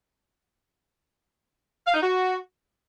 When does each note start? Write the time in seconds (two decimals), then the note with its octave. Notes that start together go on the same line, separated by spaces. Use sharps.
1.86 F5
1.94 D#4
2.02 F#4